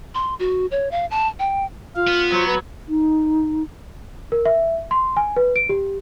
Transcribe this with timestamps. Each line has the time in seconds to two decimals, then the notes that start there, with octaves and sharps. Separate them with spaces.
0.15 C6
0.39 F#4
0.71 C#5
0.91 F5
1.11 A5
1.39 G5
1.96 F4 F5
2.07 B3
2.32 F#3 C5
2.46 B4
2.89 D#4
4.32 A#4
4.45 E5
4.91 C6
5.17 G#5
5.36 B4
5.56 D7
5.69 G4